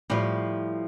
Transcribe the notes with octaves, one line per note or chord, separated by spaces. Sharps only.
A2 F3 G3